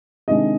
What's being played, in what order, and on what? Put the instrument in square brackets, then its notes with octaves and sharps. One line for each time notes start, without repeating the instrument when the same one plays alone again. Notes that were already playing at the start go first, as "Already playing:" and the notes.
[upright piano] C3 D#3 G#3 D4 D#5